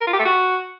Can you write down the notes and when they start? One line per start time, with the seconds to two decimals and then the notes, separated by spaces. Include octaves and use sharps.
0.01 A#4
0.07 F4
0.13 G4
0.19 A3
0.25 F#4